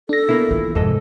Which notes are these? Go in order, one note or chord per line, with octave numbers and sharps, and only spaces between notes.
D4 A4 A#6
B2 A#3 E4
E3 F4
F1 F2 G#2 A4 D#5